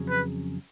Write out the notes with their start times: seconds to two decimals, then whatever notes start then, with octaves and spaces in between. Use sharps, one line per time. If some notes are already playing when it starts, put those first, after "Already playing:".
Already playing: F2 C#3 F#3 C#4 G#4
0.09 B4